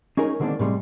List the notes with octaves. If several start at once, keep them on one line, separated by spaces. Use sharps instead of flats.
C#4 D#4 G#4 A#4 C#5
D3 D#3 G#3 A#3 C4 D4
A2 C3 G3 G#3